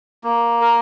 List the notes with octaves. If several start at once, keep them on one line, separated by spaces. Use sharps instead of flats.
A#3
A#4